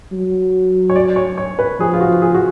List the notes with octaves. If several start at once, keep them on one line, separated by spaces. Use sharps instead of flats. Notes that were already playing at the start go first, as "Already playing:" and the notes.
F#3
C#5
D5
C#5
C#5
B4
F3 G#4
F4
F#4
G#4
F#4